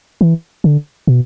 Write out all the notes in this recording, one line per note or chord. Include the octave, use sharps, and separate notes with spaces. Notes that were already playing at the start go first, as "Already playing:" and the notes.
E3
D3
B2